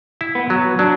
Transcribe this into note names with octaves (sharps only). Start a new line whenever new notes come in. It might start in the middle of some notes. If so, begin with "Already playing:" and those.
E4
B3
F#3
F#3 D4